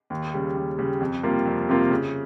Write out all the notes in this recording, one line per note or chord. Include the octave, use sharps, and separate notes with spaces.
D#2
C#3 G3
D#2
C#3 G3
F2
C3 G3 A#3 F4
F2
C3 G3 A#3 F4
C#3